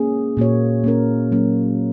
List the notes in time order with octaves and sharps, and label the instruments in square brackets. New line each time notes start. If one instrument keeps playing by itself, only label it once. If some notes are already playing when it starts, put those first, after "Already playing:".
Already playing: [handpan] A#3 C#4 G#4
A#2 A#3 F#4 C#5
A#3 C#4 A#4
F#3 A#3 C#4